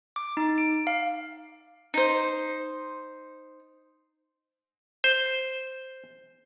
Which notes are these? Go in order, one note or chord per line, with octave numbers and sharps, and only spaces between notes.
D6
D#4
D7
F5
D#4 C5
C5